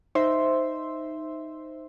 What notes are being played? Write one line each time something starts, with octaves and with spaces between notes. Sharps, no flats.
D#4 C5 E5 C6